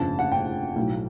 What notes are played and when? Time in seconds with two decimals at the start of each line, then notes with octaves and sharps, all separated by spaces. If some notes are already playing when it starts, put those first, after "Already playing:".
Already playing: G1 F2 C#3 A5
0.19 F#5
0.32 G5
0.76 B1 A2 F#3